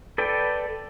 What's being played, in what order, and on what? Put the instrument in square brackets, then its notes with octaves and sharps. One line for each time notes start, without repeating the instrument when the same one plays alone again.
[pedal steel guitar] A4 B4 D5 G5